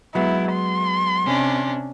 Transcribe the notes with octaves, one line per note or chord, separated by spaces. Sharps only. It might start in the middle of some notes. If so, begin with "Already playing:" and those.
F#3 G#3 B3 E4
C6
C3 C#4 D4